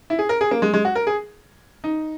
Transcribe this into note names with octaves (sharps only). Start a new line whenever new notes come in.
E4
G#4
A#4
G#4
A#3
G#3
G#3
F#4
A#4
G#4
D#4